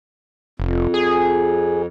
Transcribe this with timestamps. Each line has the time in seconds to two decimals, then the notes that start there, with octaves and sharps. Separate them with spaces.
0.60 F1 F2
0.94 G#4